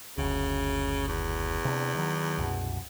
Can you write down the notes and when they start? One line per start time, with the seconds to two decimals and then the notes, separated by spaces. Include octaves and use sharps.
0.18 F#1 D2 C#3
1.08 E2
1.65 C3 D4
1.95 D#3 F#3
2.38 C2 F#2 B2